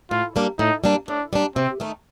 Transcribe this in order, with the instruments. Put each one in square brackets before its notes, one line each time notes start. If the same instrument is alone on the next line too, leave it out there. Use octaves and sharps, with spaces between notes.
[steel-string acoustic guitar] A2 [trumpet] F4
[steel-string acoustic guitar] G3 A#3 D4
[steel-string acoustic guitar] A2 [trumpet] D#4
[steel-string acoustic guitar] G3 A#3 D4
[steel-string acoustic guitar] A2 [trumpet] D4
[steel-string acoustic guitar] G3 A#3 D4
[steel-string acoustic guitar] C3 [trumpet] C4
[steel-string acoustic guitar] D#3 A3 D#4